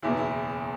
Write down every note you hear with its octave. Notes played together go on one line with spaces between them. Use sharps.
F#1 E2 B2 E4
E4